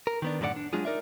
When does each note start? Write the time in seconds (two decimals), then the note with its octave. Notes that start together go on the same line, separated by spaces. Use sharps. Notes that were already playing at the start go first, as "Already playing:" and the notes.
0.07 A#4
0.22 D#3 B3 D4
0.40 F#2 A2 D3 A4 D5 F#5
0.56 D4
0.73 F#3 G#3 D4 F4 G#4
0.85 D#4 A#4 D5 E5